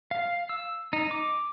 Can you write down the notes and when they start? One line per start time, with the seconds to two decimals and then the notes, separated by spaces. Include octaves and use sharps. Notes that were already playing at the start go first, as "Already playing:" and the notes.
0.11 F5
0.49 E6
0.93 D#4
1.11 D6